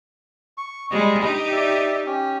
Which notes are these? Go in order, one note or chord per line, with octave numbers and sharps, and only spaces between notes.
C#6
G3 G#3 D#5
D#4 G4
D5 E5
C#4 G4